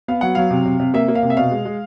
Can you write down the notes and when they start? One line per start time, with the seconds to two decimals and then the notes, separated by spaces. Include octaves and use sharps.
0.08 B3 F5
0.21 F#3 F#5
0.35 F#3 F5
0.50 C3
0.65 C3
0.80 C3
0.94 A#3 E5
1.08 A#3
1.15 F5
1.22 C3
1.30 E5
1.37 B2 F5
1.51 G#3
1.65 G#3